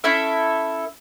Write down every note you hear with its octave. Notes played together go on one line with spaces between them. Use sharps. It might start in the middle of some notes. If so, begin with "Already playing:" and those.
C#4 E4 A4 E5